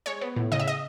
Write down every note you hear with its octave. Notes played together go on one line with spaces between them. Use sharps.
G#3 C#5
B3
A2
C#3 D#5
E5
D#5